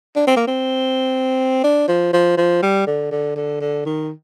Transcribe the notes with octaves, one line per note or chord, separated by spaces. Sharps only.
D4
C4
A#3
C4
D4
F3
F3
F3
G3
D3
D3
D3
D3
D#3